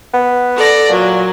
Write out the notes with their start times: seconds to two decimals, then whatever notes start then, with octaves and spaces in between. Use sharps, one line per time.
0.13 B3
0.55 A4 D5 A#6
0.89 A#2 F#3